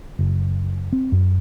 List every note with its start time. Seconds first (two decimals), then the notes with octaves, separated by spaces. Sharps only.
0.19 F#1
0.92 C4
1.12 F#2